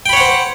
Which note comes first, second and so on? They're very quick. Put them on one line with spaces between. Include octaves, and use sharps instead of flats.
G5 B5 C#5 F#5 C5